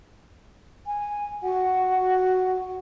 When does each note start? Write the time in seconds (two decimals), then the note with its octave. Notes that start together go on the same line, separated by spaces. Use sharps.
0.87 G#5
1.43 F#4 F#5